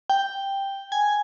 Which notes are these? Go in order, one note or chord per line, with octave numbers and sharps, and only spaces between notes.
G5
G#5